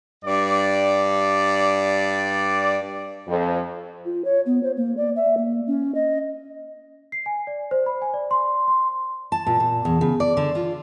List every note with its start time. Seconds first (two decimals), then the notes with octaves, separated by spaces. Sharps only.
0.24 G2 D5
3.28 F2
4.05 F4
4.25 C#5
4.46 B3
4.63 C5
4.77 A#3
4.97 D5
5.16 E5
5.37 A#3
5.67 C#4
5.95 D#5
7.12 C7
7.26 G#5
7.47 D5
7.71 C5
7.86 B5
8.02 G#5
8.14 D5
8.31 C6
8.68 C6
9.32 A5
9.46 A#2
9.60 A#2
9.85 E2
10.01 C#3
10.20 D5
10.37 D3
10.55 F4